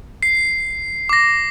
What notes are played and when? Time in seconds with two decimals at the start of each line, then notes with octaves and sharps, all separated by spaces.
0.23 C7
1.09 D6 A#6